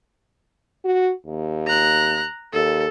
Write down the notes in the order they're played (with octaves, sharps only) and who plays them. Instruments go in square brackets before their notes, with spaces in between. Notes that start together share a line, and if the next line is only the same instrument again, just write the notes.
[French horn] F#4
D#2
[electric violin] A#5 F#6
[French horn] D#2 [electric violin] A4